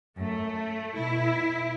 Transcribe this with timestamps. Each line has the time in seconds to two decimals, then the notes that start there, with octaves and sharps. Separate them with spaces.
0.17 F#2 A3
0.94 B2 E4